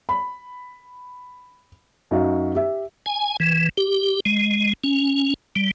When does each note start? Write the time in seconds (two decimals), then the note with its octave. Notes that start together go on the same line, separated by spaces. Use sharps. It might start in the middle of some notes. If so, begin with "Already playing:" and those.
0.09 B5
2.11 F#2 D#4 F#4 F5
2.55 G4 E5
3.06 G#5
3.40 E3
3.77 G4
4.26 G#3
4.84 C#4
5.56 G3